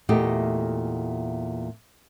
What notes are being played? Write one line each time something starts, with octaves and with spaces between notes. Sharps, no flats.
E2 A#2 A3 G4 D#5